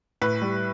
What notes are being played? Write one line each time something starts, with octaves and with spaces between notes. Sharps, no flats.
A2 B4
G3